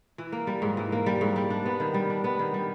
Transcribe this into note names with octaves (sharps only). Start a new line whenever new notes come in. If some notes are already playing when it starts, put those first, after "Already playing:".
E3
A#3
G3
G#2
E3
A#3
G3
G#2
G3
D4
B3
D#3
G3
D4
B3
D#3
G3